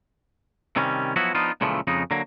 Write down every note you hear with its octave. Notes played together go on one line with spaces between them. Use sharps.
C3 D#3 G3 C#4
F3 F#3 B3 E4 F#4
F3 B3 D4 D#4 F4
C#2 A#2 C#3 E3 F3 A3
F2 C#3 G#3 D#4
D3 F#3 A#3